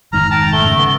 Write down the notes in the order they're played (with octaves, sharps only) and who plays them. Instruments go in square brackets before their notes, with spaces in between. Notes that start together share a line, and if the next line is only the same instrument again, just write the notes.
[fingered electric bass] F1 G#2 D#3 [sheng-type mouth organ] A#5 [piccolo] F6
[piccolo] G5 [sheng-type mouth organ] A5 A#5
[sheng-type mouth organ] A3 [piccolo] G7
[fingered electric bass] C#3
[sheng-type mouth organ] B3